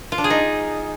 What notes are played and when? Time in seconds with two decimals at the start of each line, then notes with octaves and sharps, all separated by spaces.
0.12 F4
0.18 D4
0.24 G#4
0.30 D#4